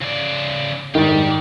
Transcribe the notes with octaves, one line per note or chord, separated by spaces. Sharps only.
C#3 D5
G#2 D#3 G4 D5